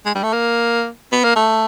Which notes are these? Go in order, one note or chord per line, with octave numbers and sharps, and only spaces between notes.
G#3
G3
A3
A#3
B3
A#3
A3